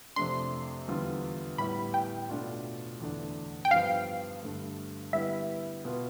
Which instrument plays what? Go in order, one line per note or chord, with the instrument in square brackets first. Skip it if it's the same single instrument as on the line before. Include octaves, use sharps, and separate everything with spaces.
[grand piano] F2 C3 F3 A3 D4 [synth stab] C6
[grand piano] E2 D3 G3 B3 F4
[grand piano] A2 G3 B3 E4 G4 [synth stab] B5
[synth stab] G5
[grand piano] B2 A3 D4 F4
E2 D3 A3 D4
[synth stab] G5
[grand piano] G2 F3 B3 [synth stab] F5
[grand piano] G2 D3 A3
[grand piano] D3 G3 B3 E4 [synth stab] E5
[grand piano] B2 B3 F4